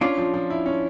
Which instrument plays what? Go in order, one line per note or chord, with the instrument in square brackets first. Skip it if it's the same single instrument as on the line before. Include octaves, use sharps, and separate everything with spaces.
[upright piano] C#4 [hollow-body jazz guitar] D4 F4
[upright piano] F3
F3
E4
C#4